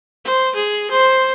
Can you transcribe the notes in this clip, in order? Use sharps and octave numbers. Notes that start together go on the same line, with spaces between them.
C5
G#4
C5